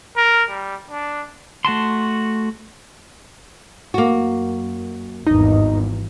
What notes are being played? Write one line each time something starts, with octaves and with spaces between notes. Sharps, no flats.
A#4
G3
D4
A3 F#4 A5 C6
F#2 A#3 F#4
G#1 E2 G2 D#4